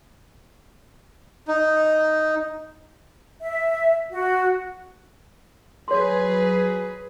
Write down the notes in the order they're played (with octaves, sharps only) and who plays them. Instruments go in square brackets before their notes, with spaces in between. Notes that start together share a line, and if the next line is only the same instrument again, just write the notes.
[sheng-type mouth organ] D#4
[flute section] E5
F#4
[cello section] F#3 G#4 B4 [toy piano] C#5 C6